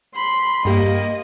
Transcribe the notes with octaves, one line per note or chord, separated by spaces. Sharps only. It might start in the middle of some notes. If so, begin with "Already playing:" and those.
B5 C6
G2 A#3 G4 D#5